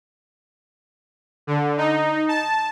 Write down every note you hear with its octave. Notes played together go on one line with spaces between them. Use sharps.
D3
D#4
A5